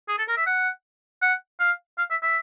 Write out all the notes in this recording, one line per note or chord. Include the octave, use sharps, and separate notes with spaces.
G#4
A4
A#4
E5
F#5
F#5
F5
F5
E5
E5